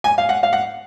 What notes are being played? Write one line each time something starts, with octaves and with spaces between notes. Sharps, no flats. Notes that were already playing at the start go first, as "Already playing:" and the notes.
G#5
F5
F#5
F5
F#5